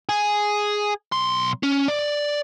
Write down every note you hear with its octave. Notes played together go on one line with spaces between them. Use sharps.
G#4
B1 C6
C#4
D5